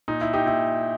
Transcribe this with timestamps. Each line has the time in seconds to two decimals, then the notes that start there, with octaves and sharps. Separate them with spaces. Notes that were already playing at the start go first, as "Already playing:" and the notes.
0.08 A#2 D#4
0.21 E4
0.33 D#4 G4
0.46 A#2 E4